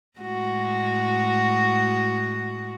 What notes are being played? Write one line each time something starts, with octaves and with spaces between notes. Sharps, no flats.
A2 G#3 F#4